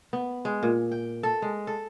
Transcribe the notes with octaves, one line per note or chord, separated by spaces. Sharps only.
B3
G#3
A#2
G5
A4
G#3
A4